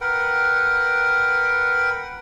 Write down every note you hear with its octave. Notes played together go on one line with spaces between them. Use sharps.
A#4 B4 F#5 G5